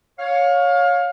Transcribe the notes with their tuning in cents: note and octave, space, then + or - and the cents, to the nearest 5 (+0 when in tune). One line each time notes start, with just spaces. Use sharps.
C#5 +5 F5 +25